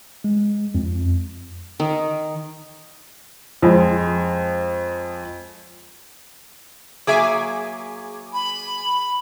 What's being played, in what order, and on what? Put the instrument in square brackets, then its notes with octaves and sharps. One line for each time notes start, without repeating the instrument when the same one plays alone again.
[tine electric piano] G#3
F2
[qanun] D#3
[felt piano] F2 G#3
[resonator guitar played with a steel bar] F#3 A#3 E5 [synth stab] G#4 G#5 D6
[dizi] B5